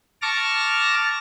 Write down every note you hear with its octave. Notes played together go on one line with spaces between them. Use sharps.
A5 C#6 D6 F6 A#6